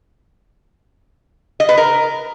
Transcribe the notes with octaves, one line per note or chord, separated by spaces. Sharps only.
D#5
B4
A#4